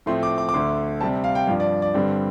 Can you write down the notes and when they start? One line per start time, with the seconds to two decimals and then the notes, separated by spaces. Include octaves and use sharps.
0.06 A2 F3 A3 C4 C6
0.23 D6
0.38 D6
0.49 D6
0.53 D2 D3 A3 C6
1.01 C3 G3 C4 A5
1.24 F5
1.35 G5
1.47 G2 F3 D4 F5
1.60 D5
1.82 D5
1.94 G2 D3 G3 C4